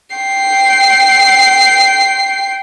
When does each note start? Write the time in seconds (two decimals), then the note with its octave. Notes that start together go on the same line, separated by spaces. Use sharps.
0.16 G5 C7